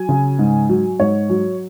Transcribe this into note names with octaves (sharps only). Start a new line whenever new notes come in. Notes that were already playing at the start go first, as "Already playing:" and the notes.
Already playing: F#3 G#5
C#3
G#2
F#3
G#2 C#5
F#3